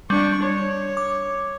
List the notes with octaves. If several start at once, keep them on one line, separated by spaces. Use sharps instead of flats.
G3 D4 C#6
C#5
D6